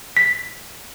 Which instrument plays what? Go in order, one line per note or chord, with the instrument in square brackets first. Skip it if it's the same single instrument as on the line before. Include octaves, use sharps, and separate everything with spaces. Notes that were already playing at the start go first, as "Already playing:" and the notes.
[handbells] B6